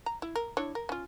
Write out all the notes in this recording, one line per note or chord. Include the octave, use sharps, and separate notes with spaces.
A#5
E4
A#4
D4 E4 C#5
A#4
C#4 F4